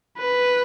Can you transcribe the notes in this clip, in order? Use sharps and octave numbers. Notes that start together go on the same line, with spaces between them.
B4